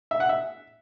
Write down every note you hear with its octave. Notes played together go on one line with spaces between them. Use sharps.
E5
F#5
E5